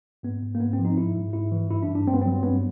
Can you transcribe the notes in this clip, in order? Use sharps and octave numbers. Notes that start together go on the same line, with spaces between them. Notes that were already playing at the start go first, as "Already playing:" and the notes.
G#2 B3
G#2
A#3
G#2 B3
C4
F3
D#4
G#2 E4
G#2
G#2 E4
E3
G2 E4
D4
G2
D4
G2 C4
B3
F#3 C4
G2 B3